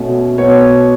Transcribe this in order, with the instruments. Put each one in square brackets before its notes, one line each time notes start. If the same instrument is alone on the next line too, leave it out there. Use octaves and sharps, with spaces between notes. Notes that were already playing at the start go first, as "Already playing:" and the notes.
Already playing: [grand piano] B2 A3 C#4
B2 B3 C#5